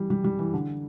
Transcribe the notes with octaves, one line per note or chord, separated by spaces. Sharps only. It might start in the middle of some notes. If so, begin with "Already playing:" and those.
Already playing: E3 G3
G3
G3
E3
D3